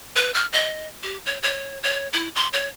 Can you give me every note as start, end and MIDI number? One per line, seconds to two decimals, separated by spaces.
0.16 0.34 71
0.34 0.46 89
0.53 0.87 75
1.03 1.17 67
1.26 1.38 73
1.43 1.79 73
1.83 2.08 73
2.13 2.28 64
2.36 2.48 84
2.53 2.68 73